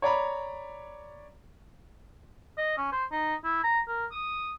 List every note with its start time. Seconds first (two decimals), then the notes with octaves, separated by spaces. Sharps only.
0.02 C#5 D5 A#5 B5
2.58 D#5
2.78 C#4
2.92 C5
3.12 D#4
3.44 E4
3.63 A#5
3.88 A#4
4.12 D#6